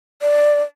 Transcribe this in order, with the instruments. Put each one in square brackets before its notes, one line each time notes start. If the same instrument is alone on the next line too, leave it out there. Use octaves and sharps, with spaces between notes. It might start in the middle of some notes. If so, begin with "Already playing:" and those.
[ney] D5